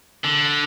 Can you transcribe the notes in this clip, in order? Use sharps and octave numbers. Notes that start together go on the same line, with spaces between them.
D3